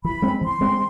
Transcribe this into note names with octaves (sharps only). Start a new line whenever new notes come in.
E3 B5
G#3 C4
E3 C6
G#3 C4